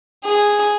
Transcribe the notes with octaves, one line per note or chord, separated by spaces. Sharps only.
G#4